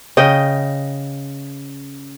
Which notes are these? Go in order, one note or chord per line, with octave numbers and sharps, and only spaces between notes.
C#3 D#5 G5